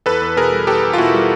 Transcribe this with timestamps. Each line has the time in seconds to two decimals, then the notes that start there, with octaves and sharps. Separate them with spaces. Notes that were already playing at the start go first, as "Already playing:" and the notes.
0.06 E2 A4 B4
0.22 E2
0.37 B2 G#4 A#4
0.52 G3
0.67 E2 G4 A4
0.83 E2
0.93 F4
0.98 B2 E4 F#4
1.14 G3